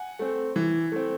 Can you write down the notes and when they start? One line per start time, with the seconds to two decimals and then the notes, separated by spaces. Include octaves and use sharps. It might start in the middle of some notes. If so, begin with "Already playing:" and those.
Already playing: F#5 G#5
0.19 A3 C4
0.56 E3
0.92 A3 C4